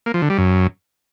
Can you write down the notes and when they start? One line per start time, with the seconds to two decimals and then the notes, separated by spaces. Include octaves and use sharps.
0.06 A#3
0.14 F3
0.22 D3
0.30 G3
0.38 F#2